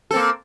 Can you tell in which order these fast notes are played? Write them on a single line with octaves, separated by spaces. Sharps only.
A4 C4 A#3